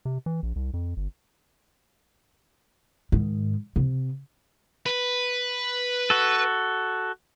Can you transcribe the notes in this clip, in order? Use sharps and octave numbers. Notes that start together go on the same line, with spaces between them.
C3
E3
A#1
C2
F2
G1
G#2 D#3
C3
B4
F#4 A4